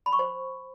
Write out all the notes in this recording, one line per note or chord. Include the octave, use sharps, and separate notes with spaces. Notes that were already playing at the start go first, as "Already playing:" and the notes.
B5
C#6
C5